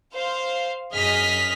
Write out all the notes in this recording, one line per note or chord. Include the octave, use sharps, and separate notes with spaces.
C5 F5
F#2 G#4 D#5 F6 B6